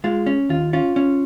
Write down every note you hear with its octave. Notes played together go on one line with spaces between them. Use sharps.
G#3 F4
C#4
D#2 F4
C#4 F4
C#4